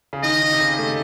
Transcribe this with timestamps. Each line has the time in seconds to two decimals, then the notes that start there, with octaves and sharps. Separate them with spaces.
0.13 C#3
0.23 D#3 D#5
0.41 D#3
0.52 C3
0.60 C#3
0.78 A3